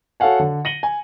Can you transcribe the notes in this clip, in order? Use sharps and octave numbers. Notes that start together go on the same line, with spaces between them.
F#4 A4 C#5 F5 F#5 G#5
D3
A#6 C#7 D#7 F#7 G7
G#5